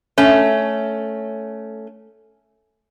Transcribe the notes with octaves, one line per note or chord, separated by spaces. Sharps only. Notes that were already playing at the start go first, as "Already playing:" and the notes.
A3 C#4